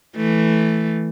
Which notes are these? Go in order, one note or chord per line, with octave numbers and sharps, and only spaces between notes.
E3 A3